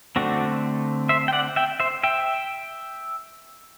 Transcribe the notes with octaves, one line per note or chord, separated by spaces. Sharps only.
D3 A3 C4 D4 F#4
C5 E5
G5
D5 F#5
E5 G5
C5 E5
E5 G5